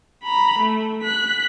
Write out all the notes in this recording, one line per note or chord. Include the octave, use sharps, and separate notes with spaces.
A#5 B5
A3
F#6 B6